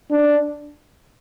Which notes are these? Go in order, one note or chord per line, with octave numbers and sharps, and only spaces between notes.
D4